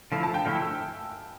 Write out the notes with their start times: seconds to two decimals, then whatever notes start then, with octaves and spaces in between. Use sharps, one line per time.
0.12 D3 F3 A3 E4 F5
0.23 A5
0.34 G5
0.45 D3 F3 A3 E4 F6
0.62 E6